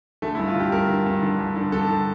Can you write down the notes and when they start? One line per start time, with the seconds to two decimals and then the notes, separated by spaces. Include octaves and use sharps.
0.22 D3 A3
0.35 E4
0.39 G2
0.48 F4
0.55 D3 G4
0.72 G2 A#4
0.89 D3
1.06 G2
1.22 D3
1.39 G2
1.56 D3
1.72 G2 A4
1.89 D3